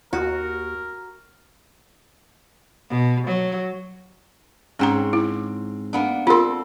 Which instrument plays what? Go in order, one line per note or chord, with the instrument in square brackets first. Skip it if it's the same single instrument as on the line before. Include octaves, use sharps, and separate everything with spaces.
[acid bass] D#2 [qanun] F#4 [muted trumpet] A#4
[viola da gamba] B2
F#3
[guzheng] G#2 C4 C#5 [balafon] C#4 G5 A#5
[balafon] E4
[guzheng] A#3 B3 D4
[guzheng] C4 A4 [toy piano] F4 A#4 [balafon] B5 C6